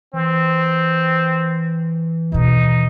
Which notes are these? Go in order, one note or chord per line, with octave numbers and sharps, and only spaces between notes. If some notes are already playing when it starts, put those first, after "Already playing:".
E3 C4
D#2 B2 D#4